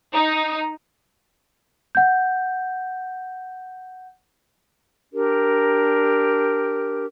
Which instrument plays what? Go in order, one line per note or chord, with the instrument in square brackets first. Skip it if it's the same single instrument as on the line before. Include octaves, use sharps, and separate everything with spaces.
[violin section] D#4
[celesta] F#5 G6
[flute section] D4 G4 A#4